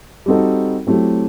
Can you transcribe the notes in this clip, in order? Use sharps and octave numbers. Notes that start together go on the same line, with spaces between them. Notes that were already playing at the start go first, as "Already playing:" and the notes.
G3 C4 D#4 F#4 A4
F#3 A3 C4 E4 G4